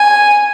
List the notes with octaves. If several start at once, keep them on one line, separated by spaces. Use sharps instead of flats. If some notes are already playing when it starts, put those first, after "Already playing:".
Already playing: G#5